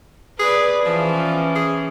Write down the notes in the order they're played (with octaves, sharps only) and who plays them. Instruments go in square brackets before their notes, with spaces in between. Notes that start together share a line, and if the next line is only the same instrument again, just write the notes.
[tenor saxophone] G#4 [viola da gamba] B4 D5
[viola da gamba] E3 C#4 [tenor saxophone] F3
[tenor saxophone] G#4